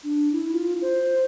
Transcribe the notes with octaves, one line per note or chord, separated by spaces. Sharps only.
D4
E4
F4
C5